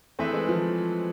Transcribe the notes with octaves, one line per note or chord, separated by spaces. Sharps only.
E3 A3 C4 G#4 B4 E5
G#3
F3